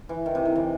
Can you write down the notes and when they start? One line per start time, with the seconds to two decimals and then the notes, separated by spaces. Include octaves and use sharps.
0.09 E3
0.26 D#3
0.35 C3
0.45 D#3
0.56 E3